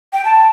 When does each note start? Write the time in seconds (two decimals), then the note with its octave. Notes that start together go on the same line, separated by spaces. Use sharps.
0.13 G5
0.25 A5